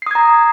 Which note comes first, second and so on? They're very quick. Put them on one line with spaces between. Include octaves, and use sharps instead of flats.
C7 D#6 G#6 A#5